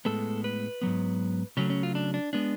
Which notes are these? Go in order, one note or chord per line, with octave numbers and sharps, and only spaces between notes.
A2 G#3 B3 A4
B4
G#2 F#3 B3
C#3 F#3 A3 C#4
C#4
F4
D4
D4
G#3 B3 D4